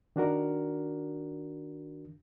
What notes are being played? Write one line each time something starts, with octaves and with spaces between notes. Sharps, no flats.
D#3 D4 F#4 A#4